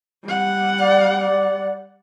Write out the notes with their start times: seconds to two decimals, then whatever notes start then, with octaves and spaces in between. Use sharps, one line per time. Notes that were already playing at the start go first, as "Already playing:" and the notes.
0.25 G3 F#5
0.80 D5
1.17 D5